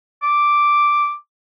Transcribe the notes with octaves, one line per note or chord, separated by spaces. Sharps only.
D6